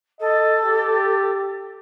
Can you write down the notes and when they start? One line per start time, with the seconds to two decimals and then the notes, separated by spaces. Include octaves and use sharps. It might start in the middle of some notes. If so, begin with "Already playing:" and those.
0.20 A4 D#5
0.62 G4